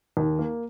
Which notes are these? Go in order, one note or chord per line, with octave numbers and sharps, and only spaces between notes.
D#2
A#3